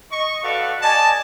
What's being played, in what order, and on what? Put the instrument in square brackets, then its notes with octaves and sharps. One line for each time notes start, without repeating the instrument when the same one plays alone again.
[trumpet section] D#5 C#6
F#4 A4 B4 D5 F5
D5 D#5 G#5 A5